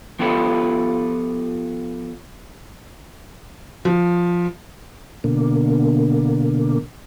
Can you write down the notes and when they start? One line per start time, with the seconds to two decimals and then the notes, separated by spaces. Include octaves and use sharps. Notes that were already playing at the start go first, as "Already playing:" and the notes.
0.19 F3 B3 F4 G4 A4 B4
3.85 F3
5.24 B2 D3 A#3